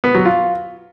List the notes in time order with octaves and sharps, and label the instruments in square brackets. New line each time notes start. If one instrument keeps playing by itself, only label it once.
[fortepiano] B3
F#3
F4